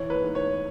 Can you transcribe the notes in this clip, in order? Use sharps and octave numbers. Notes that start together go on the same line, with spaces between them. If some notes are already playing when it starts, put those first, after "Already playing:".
Already playing: E3 C#5
B4
G#2
C#5